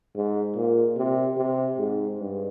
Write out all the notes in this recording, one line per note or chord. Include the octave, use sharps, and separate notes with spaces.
G#2
A#2
C3
C3
G#2
G2